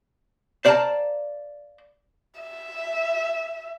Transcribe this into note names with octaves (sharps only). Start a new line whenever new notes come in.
C5 D5 F5 G5 A5 A#5
E5